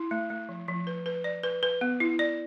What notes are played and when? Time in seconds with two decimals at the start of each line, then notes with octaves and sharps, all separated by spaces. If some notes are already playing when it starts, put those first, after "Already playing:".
Already playing: E4
0.11 A3
0.30 A3
0.49 F3
0.68 F3
0.87 B4
1.06 B4
1.24 D5
1.43 B4
1.63 B4
1.81 B3
2.00 E4
2.19 D5